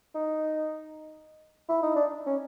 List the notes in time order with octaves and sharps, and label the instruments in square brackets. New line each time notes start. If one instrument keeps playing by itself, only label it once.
[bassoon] D#4
E4
D#4
D4
C#4